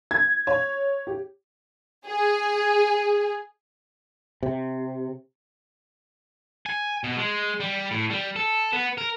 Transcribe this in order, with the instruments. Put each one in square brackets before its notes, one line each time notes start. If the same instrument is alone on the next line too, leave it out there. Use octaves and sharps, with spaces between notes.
[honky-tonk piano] G#6
C#5
G4
[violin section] G#4
[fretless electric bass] C3
[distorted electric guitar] G#5
B2
G#3
G3
A2
G3
A4
B3
A#4